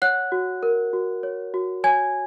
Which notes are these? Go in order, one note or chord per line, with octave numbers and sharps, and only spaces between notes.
C#5 F#5 F#6
F#4
A#4
F#4
C#5
F#4
C#5 G#5 G#6